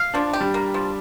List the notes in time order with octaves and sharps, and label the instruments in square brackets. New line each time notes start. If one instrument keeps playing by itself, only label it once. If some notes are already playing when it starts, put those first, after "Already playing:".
Already playing: [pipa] F5
[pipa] F3 [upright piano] D4
[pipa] G4
[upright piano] G3
[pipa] A#3
F3